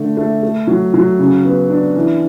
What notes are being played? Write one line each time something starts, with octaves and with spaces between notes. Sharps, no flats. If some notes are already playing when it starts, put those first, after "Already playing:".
Already playing: D3 A3
A3
A3
F#3
F#3
C#3
B3
D4
E3